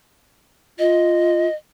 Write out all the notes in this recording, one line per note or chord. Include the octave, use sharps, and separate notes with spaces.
F4 D#5